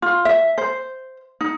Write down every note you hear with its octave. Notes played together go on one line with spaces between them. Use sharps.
F4
E5
C5
D#4